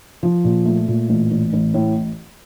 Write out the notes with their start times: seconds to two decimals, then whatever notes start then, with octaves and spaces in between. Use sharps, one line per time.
0.23 F3
0.44 A#2
0.65 A3
0.88 A#2
1.09 A1
1.31 A1
1.53 A1
1.74 A2